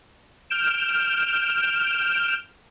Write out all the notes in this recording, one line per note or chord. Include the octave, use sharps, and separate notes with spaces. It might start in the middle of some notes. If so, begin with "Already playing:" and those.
F6 G6 D7 E7